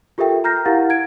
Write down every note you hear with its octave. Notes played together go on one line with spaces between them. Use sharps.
F4 G4 A4 A#4 E5 G5
A#5 F6 G6 A#6 C7
E4 G4 A#4 F5 F#5 A6
G#6 D7